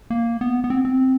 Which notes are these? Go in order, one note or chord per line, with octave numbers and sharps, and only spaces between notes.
A#3
B3
B3
C4
C4